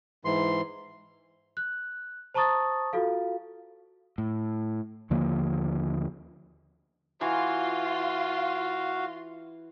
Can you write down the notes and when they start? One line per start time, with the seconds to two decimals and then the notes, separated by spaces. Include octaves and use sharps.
0.25 G#2 E3 C6
1.57 F#6
2.34 C5 A5 A#5 C#6 D#6 A6
2.93 F4 F#4 A4 F5
4.18 A2
5.10 D#2 D3 F3 A#3
7.21 E3 F4 F#4 F5 C6